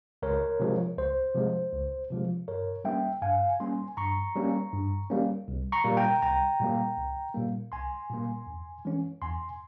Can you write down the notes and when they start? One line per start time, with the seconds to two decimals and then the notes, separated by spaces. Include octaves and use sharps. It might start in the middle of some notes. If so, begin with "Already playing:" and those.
0.22 C#2 A#4 C#5
0.60 C3 F3 G#3
0.97 C#2 C5
1.35 C3 F3 G#3
1.73 C#2
2.10 C3 F3 G#3
2.48 G2 A#4 C#5
2.85 G3 A#3 C#4 E5 G5
3.22 G2 F5 G#5
3.60 G3 A#3 C#4 G#5 C6
3.97 G2 A#5 C#6
4.36 G3 A#3 C#4
4.73 G2
5.10 G3 A#3 C#4
5.48 C2
5.72 A#5 C#6
5.84 A#2 G3 A#3
5.97 G5 A#5
6.22 C2 G5 A#5
6.60 A#2 G3 A#3
6.97 C2
7.34 A#2 G3 A#3
7.72 C2 G#5 C6
8.10 A#2 G3 A#3
8.47 E2
8.85 E3 G#3 C#4
9.22 E2 G#5 C6